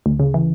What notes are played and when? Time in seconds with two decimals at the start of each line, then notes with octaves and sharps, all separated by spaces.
0.06 D2
0.20 C#3
0.34 E3